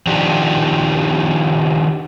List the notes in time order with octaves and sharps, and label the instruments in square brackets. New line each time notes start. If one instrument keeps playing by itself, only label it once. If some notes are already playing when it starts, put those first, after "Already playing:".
[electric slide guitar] D#3 F3 D4 D#4 F#4 G4